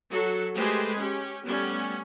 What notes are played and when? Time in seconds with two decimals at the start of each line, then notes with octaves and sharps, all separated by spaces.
0.11 F#3 F#4 A4
0.55 G#3 A3 G4 G#4 B4 C5
0.98 C#4 G4
1.45 G3 A3 B3 C#4